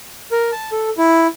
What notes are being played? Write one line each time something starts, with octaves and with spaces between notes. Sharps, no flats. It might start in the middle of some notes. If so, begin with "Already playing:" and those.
A#4
A5
A4
E4